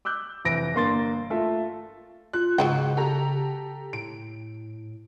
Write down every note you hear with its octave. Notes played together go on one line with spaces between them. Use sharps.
D6 E6 F#6 G6
F1 E3 A#6 D7
G1 A#3 C6 A6
A3 F4 A4 E5
F4 F#6
G#2 C#3 F#3 F#4 G5
G4 A4 A#5
A2 D7